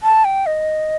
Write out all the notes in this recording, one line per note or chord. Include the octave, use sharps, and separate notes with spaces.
A5
G5
D#5